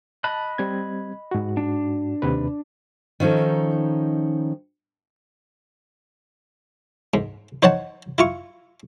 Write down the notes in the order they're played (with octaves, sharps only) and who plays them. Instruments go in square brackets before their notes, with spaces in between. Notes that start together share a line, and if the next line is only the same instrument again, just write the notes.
[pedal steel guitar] D#5 B5 F#6 [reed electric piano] A5
[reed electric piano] G3 C4 G#6
G#2 F#4
[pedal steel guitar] D4
[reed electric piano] D#2 C3 B4
[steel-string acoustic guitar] D#3 F3 C#4 D#4 A4
[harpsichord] G#2
D#4 C5 C#5 F#5 A5
E4 F4 C#6